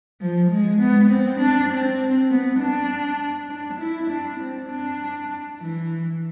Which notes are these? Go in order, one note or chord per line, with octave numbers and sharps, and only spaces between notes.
F3
G#3
B3
C4
D4
C4
B3
D4
D4
E4
D4
C4
D4
E3